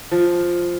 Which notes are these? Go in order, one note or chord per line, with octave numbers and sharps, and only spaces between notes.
F3